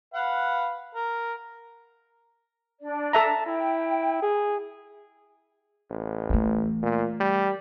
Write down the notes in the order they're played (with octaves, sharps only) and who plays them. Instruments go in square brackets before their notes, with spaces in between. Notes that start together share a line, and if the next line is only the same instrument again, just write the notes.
[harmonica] B4 F5 F#5
A#4
[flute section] D4 D5
[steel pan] A4 E5 A#5 [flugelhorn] A5
[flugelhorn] E4 [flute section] G5
[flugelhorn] G#4
[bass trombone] A1
[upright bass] E3 A3
[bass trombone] A#2
G3